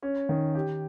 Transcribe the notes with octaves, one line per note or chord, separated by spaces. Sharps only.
C#4
D#3
G4